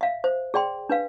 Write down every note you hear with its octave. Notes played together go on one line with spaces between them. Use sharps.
E5 F5
C5
G#4 D5 G5 C6
D4 B4 F5